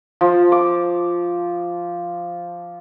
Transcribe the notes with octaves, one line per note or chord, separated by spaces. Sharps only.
F3
D6